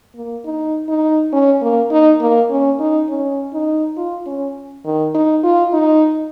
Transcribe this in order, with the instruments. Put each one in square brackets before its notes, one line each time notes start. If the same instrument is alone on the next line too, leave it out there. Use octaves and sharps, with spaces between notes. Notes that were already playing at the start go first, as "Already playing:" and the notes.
[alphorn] A#3
D#4
D#4
C#4
A#3
D#4
A#3
C#4
D#4
C#4
D#4
F4
C#4
D#3
D#4
F4
D#4